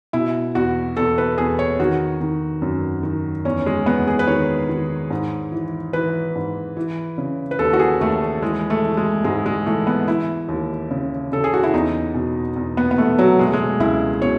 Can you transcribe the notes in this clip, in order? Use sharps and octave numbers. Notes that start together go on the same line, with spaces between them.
B2 E4
E2 F#4
E2 A4
B4
E2 G#4
C#5
D#3 F#4
D#3
F#2
D#3
E2 C#4
G#3
E2 B3
G#4
B4
D#3 C#5
D#3
G#2
E3
E3 B4
G#2
E3
C#3
B4
D#2 A4
F#4
G#4
D#2 A3
E3 G#3
A3
E3
G#3
G#2 G#3
G#3
E3 A3
B3
E3 E4
D#2
C#3
C#3 A4
G#4
F#4
E4
E2 D#4
B2
E2
B3
B3
E2 A3
F#3
B2 G#3
A3
G#3
C#2 E4
B2 C#5